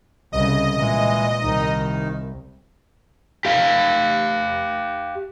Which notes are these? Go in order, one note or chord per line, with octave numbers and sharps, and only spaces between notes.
C2 C#3 D#5
A#2 E3 G#3
C2 D#3 D#4
G4 F5